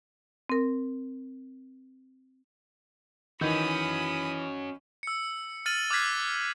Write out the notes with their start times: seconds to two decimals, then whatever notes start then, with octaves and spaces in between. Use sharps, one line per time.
0.50 C4 A#4
3.41 D#3 E3 C#4 F#4 D#5 B5 D#6 G6
5.03 E6 C#7
5.66 F6 A6 C#7 D#7 F#7
5.90 D6 F6 F#6 G#6 B6 C7